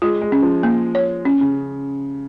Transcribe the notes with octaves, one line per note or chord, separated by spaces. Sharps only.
G#3 F4
G#3
C#4
F3
A#3
C#5
C#4
C#3